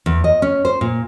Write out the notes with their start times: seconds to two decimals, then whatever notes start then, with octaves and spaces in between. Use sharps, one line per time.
0.06 E2
0.24 D#5
0.42 C#4
0.65 C5
0.81 A#2